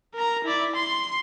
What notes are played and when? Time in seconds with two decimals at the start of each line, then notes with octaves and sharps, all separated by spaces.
0.14 A#4 A#5
0.44 E4 D5
0.75 C6